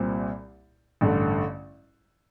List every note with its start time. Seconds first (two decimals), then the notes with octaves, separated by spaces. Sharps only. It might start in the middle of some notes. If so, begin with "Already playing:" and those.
Already playing: C2 A#2 G3 C4
1.01 A1 G2 D3 A3